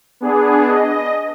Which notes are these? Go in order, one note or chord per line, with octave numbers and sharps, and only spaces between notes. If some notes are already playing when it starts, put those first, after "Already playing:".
B3 D4 G#4
D#5